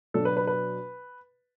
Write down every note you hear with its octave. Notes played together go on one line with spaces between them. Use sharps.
B2 F#3 D4 A4
B4
B4
B4